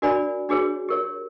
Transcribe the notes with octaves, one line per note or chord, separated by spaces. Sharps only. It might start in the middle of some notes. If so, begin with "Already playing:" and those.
D4 F#4 A#4 D5 G#5 B5
D4 F#4 G#4 B4 C#5
G4 A#4 C#5